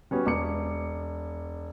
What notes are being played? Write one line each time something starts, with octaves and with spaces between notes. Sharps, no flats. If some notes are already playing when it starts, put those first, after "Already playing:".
G3 B3 C#4 F#4
E1 D6 C#7